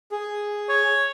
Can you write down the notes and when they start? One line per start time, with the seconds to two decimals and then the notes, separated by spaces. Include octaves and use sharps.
0.11 G#4
0.69 C#5